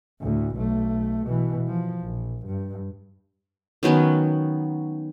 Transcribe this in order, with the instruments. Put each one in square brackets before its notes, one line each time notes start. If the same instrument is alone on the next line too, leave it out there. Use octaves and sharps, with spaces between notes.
[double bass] D2 A2
B1 A3
B2 E3
F3
A#1
G2
[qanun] D#3 F#3 B3 C#4